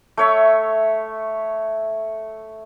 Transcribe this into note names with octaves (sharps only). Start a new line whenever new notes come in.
A3 C#5 E5